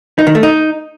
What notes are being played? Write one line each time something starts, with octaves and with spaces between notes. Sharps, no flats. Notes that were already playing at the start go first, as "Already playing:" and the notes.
D#4
D#3
A3
D#4